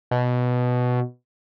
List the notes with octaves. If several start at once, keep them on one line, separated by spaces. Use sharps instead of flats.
B2